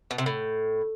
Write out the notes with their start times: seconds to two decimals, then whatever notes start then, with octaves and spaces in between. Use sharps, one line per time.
0.11 B2
0.18 C3
0.26 A2